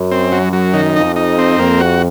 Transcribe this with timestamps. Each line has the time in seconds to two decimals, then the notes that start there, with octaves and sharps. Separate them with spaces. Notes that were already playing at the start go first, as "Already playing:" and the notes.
Already playing: F#2
0.11 C4
0.32 F#3
0.53 F#3
0.74 D#3
0.95 F2 D#4
1.16 D#4
1.38 C4
1.58 F2 A#3
1.80 F#4